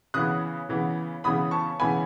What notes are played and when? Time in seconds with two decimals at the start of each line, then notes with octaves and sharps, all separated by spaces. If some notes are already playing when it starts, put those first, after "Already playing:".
0.14 C#3 E3 B3 D#6 F#6
0.69 C#3 E3 B3
1.24 C#3 E3 B3 B5 D#6
1.51 A5 C#6
1.79 C#3 E3 B3 G#5 B5